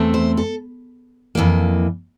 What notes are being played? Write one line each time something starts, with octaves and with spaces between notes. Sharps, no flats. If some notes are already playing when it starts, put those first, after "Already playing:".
Already playing: E2 E3 A3 C4
C5
A4
F2 E3 A#3